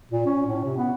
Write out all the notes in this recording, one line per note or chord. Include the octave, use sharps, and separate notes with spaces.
A#2
C#4
A2
C3
B3